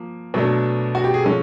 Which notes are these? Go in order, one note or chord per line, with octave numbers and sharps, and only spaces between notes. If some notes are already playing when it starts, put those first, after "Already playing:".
Already playing: F3 A#3
B2 F#3 A3 D4
F#4
G4
G#4
F3 G#3 C#4 A4